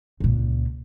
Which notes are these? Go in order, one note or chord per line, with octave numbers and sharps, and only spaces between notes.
C#2 A#2